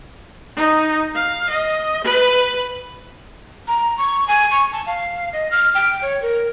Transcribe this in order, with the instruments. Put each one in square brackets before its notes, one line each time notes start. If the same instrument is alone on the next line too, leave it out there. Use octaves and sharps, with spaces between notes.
[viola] D#4
F5
D#5
B4
[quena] A#5
C#6
G#5
C#6
A5
F5
D#5
F6
G5
C#5
A#4